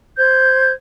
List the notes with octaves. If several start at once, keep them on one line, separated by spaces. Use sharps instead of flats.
C5 G6 G#6